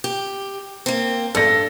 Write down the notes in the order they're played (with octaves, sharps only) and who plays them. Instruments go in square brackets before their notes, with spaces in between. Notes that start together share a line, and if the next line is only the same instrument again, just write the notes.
[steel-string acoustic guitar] G4
A#3 C4
[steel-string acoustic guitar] G2 [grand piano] A4 A#6